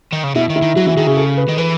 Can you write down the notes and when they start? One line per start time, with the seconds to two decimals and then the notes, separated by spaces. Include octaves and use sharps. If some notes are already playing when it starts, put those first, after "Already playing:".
0.12 D#3
0.24 C#3
0.35 B2 E4
0.50 D#3
0.56 E4
0.62 D#3
0.76 F#3 F#4
0.86 E3 E4
0.96 D#3 G#4
1.07 C#3 G#4
1.17 A4
1.37 B4
1.49 D#3
1.58 E3 B4